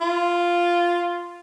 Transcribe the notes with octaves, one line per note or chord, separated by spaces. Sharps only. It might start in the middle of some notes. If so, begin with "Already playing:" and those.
F4